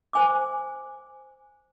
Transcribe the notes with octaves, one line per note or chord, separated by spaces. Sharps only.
C5 G#5 D6